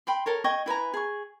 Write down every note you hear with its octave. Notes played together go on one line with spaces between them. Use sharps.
G5 B5 C6
A4 A#4 C#5
D#5 G5 G#5 C#6
E4 B4 G#5 A#5
G#4 C#6